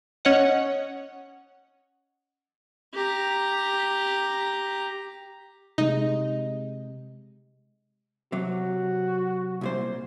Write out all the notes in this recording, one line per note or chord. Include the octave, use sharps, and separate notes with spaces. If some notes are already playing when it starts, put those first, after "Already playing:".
C#4 C#5 D#5 F#5
G4 A#5
C3 G#3 D#4
C3 F#3 F#4
C2 A#2 C5